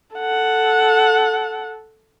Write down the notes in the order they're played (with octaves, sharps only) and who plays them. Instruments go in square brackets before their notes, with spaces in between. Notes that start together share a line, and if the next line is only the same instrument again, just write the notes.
[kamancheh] A4 F#5